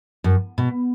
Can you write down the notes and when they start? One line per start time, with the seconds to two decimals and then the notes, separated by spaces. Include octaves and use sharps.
0.24 F#2
0.58 B2